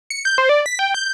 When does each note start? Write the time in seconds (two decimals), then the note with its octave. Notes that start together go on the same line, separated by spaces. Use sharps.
0.10 C#7
0.25 G6
0.38 C5
0.49 D5
0.66 B6
0.79 G5
0.94 G6